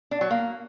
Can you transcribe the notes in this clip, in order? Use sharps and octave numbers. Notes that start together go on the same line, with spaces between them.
D4
F#3
A#3